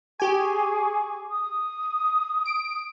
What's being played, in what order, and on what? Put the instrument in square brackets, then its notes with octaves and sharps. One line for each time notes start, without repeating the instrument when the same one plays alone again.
[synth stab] G4 G#5 [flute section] G#4 C#6 D6
[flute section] D#6
[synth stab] D7